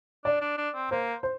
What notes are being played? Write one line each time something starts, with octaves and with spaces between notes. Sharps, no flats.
D4 D5
D4
D4
C4
A#3 C5
C5